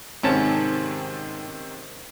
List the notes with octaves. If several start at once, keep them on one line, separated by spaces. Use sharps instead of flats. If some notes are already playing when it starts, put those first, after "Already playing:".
G#2 C3 D#3 C4 C#4 A5